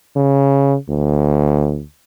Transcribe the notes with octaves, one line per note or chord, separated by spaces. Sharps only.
C#3
D2